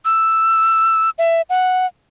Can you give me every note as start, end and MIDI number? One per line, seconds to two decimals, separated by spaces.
0.05 1.10 88
1.18 1.42 76
1.50 1.86 78